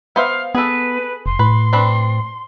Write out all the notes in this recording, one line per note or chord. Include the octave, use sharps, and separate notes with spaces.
B3 C5 E5 F5
B3 G#4 A4 B4
F1 C6
A2 B4
C4 D4 B4